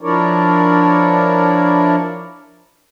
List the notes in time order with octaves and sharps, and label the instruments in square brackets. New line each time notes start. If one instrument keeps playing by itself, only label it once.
[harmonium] F3 D4 E4 A#4 C#5 D5